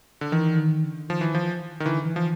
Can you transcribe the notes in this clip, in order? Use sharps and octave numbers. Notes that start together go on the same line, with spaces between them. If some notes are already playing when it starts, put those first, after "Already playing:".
D3
D#3 E3
D#3
D3
D#3 F3
E3
F3
D#3
D3 E3
E3
F3